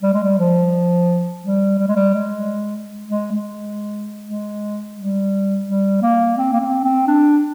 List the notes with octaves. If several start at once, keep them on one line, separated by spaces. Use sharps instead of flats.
G3
G#3
G3
F3
G3
G3
G#3
G3
G#3
G#3
G#3
G#3
G3
G3
A#3
C4
A#3
C4
C4
D4